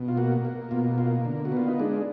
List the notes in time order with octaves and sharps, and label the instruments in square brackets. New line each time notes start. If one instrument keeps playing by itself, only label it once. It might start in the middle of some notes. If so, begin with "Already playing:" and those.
Already playing: [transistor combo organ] B2
F4
A#3 F#4
A#3
B2 F4
A#3 F4
D3
F#4
B3 F4
D#4
G#3 D4